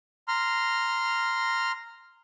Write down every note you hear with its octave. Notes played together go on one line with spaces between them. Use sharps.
A#5 C6 F6